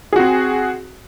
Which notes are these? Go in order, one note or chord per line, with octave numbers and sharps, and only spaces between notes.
C4 F#4 G#4